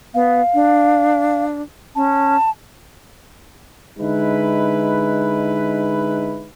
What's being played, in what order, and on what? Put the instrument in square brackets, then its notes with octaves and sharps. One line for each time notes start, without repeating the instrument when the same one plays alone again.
[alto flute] B3 [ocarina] F5
[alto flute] D4
[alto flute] C#4 [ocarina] A5
[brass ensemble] D3 G#3 D#4 E4 B4